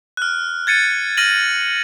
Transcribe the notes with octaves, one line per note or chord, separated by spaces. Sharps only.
F6 F#6
G#6 A6 C#7 D#7
F6 A#6 D#7 F#7